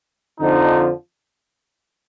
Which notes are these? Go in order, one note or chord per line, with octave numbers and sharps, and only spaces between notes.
F2 D3 F3 D#4